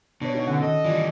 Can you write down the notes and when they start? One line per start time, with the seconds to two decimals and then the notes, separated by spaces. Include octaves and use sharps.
0.22 B2 D4 C#5
0.33 D#4 F#4 C#5
0.47 D3 C#4 F#5
0.62 D#3 A4 D#5
0.85 E3 G3 F4 D5